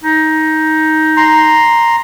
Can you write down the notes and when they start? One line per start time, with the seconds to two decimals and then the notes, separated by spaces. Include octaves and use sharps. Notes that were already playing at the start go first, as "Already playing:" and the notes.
0.04 D#4
1.17 A#5 C6